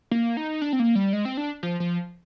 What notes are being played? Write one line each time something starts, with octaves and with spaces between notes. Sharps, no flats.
A#3
D#4
D4
C4
A#3
G3
G#3
C4
D4
F3
F3